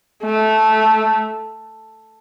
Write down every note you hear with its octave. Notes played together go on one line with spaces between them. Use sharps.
A3